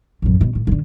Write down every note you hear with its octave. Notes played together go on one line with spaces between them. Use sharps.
A1 F#2
B2
A2
A2 D3